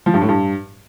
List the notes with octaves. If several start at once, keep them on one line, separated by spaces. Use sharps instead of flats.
F3
G2
A2
G2